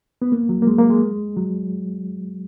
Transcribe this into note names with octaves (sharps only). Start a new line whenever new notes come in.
B3
A#3
F#3
A#3
G#3
A#3
G#3
F#3